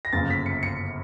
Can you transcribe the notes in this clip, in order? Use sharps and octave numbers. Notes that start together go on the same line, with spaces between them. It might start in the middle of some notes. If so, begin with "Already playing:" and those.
A#6
G1 F#2 C#3 F3 A#3 A6
B6
C#7
C#7